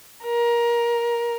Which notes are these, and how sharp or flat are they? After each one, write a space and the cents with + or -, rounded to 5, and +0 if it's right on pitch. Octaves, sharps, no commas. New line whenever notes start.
A#4 +20